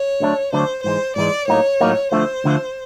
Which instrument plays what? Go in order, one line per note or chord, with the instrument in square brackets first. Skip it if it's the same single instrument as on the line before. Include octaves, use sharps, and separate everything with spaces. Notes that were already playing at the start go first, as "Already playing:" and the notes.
Already playing: [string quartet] C#5
[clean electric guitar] D2 D3 F#3 A3 D4
[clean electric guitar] D2 D3 F#3 A3 D4 [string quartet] C5
[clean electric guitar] G#2 E3 G#3 [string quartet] C5
[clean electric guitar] G#2 E3 G#3 [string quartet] D5
[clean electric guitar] A2 F#3 A#3 D#4 [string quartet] C#5
[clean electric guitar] A2 F#3 A#3 D#4
[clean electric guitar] D2 D3 F3 A3 [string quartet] C5
[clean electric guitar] D2 D3 F3 A3